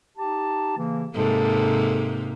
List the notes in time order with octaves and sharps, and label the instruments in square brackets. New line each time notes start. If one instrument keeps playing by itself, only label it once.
[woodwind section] D#4 G4 A5
C#3 E3 A#3
[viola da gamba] G#2 C3 A#3 [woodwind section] A4